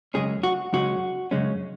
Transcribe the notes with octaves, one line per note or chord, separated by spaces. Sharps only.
F#2 C#3 G#3 C#4 G#4
F#4
F#2 C#3 G#3 C#4 F#4
F#2 C#3 G#3 C#4